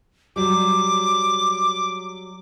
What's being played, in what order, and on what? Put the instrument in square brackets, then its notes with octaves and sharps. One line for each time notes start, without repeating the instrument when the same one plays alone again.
[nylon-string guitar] F#3 G3 [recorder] D6